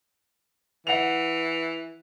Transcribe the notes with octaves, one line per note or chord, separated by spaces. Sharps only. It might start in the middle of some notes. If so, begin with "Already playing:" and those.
E3 E5 F#5 F7